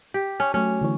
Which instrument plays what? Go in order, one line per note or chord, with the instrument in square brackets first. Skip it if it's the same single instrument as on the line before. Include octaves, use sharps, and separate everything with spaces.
[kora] G4
C#4
[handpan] F#3 A3 [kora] C#4
[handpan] D3 E3 C#5